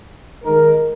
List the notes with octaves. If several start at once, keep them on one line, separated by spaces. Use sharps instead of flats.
D#3 G#3 D#4 A#4